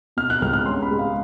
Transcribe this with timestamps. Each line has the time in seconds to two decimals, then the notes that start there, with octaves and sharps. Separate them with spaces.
0.17 B2 F6
0.30 F#6
0.42 C#2 F6
0.53 F6
0.66 C#4 C6
0.83 B5
0.91 G#3
0.99 F5